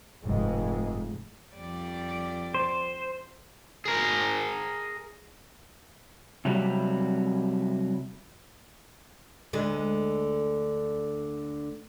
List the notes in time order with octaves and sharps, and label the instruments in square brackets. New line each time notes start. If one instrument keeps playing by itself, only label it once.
[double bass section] F1 G#2 G#3
[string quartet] F2 G3 D5
[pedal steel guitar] C5
[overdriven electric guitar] G#4 A#4
[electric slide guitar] C3 F#3 G3
[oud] D2 D3 G#3